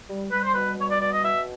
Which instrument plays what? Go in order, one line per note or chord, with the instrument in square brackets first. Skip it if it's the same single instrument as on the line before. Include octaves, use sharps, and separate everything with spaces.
[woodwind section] G3
G3 B4
C5
B2 B4
G3 C#5
D5
B2 D5
D#5
B2 E5